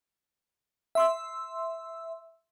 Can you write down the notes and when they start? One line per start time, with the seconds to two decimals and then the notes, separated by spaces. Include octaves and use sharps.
0.95 E5 C6 E6